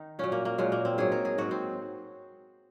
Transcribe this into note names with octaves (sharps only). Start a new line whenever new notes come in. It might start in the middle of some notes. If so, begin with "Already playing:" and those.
Already playing: D#3 D#4
A#2 F#3 C#4
A#3
A#3
A#2 F#3 G#3
A#3
C4
G#2 F#3 G#4
A#4
G#4
G#2 F#3 F#4
C4